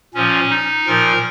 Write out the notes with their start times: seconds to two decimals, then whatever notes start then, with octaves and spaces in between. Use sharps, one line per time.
0.14 A#2 F3 C#4
0.50 D#4
0.87 A#2 F3 A#4